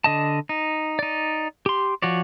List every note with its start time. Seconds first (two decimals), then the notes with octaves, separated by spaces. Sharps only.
0.04 D3 D#5 A5
0.49 D#4
0.99 D#4 D5
1.66 G4 C6
2.02 F3 F#4 C#5 D5